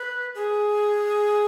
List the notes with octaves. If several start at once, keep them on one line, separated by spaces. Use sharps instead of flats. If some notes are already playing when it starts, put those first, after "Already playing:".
Already playing: B4
G#4